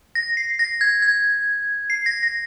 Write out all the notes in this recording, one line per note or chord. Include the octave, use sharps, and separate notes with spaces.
A#6
C7
A#6
G#6
G#6
C7
A#6
A#6